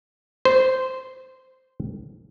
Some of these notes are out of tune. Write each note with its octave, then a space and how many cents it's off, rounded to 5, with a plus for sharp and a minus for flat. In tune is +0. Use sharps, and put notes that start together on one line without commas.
C5 -10